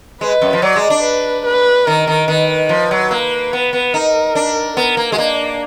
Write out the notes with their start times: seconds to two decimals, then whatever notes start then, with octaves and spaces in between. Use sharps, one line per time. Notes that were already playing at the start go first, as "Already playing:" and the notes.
0.21 G#3 B4
0.42 F#2
0.53 F3
0.62 F#3 D5
0.76 G#3
0.90 D4
1.04 B4
1.46 B4
1.87 D#3 A#4
2.07 D#3
2.28 D#3 B4
2.69 F3 B4
2.91 F#3
3.11 A#3
3.53 B3
3.73 B3
3.94 D#4 A#4
4.35 D4
4.77 B3 A#4
4.97 A#3
5.12 G#3
5.18 A#3 D4